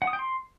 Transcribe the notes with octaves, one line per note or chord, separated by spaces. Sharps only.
F#5
D#6
G5
C6